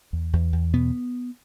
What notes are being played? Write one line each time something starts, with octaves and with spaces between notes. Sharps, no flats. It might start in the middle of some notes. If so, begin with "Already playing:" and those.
E2
E2
E2
B2 B3